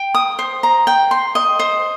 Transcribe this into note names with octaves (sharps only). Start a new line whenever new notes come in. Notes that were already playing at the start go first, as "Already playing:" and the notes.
Already playing: G5
D#6
C5
A#5
G5
C6
D#5
C5